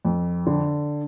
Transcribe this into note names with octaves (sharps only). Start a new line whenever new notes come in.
F2
D3